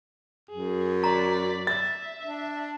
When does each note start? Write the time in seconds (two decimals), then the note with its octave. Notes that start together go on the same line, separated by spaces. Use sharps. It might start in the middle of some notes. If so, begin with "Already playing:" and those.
0.50 F#2 G#4
1.04 D5 A#5 B6
1.67 E5 A6
2.21 D4